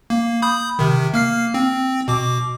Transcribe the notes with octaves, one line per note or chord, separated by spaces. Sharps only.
A#3
B5 D#6 G6
C3 D#3
A#3 F6 C7
C4
B2 D6